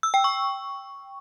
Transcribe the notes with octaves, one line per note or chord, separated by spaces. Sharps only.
E6
G5
C#6